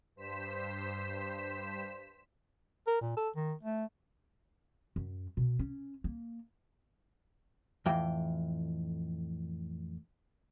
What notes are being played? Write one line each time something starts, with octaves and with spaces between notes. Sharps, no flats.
G2 C5 B6 E7
A#4
A#2
A4
D#3
A3
F#2
B2
C#4
A#3
F2 A2 E3 G5